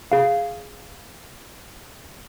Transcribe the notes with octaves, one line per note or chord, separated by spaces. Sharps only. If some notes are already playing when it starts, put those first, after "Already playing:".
G#4 F5